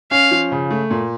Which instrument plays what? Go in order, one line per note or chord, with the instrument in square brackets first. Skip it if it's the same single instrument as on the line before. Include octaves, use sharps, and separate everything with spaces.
[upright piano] C#4 [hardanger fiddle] F5
[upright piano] F3
C#3
A3
A#2